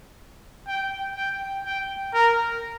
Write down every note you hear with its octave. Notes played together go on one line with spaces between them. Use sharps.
G5
G5
G5
A#4